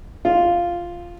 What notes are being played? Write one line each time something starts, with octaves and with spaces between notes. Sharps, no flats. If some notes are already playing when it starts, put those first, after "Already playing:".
F4